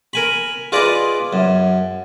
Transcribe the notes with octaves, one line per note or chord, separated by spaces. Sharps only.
A#4 G#5 B5
F4 G#4 B4 D5 D#5
F#2